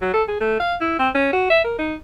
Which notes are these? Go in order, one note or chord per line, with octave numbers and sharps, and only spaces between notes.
F#3
A4
G#4
A3
F5
E4
C4
C#4
F#4
E5
A#4
D#4